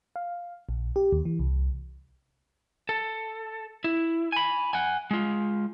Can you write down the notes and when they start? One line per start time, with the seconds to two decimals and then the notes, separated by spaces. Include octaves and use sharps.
0.16 F5
0.69 A#1
0.96 G4
1.12 D#2
1.25 E3
1.40 C2
2.89 A4
3.84 E4
4.32 G#5 B5
4.73 F#5 G#5
5.11 G#3 F4